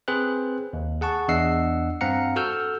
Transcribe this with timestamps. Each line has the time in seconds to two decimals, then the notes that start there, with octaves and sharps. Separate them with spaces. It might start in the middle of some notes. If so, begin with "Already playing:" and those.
0.08 C4 G#4 B4 C5 F#6
0.73 D#2
1.01 G#4 F#5 A5 C#6
1.28 E2 D4 D#5 F#5 E6 C7
2.01 G2 C4 F5 F#5 A#5 C#7
2.36 F#4 A4 E6 F6 G6